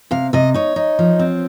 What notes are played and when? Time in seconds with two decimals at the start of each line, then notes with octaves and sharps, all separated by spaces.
0.11 C3 F5
0.33 C3 D#5
0.54 D#4 C#5
0.76 D#4
0.99 F3
1.19 C4